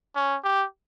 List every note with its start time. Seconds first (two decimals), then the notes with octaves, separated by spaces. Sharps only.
0.15 C#4
0.44 G4